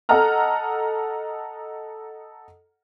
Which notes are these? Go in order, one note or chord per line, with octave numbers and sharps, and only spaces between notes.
A4 D#5 F#5 A#5 F6